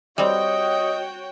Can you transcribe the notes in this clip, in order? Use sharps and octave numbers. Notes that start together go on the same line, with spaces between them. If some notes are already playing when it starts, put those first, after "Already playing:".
G3 C4 F#4 C#5 D#5 G5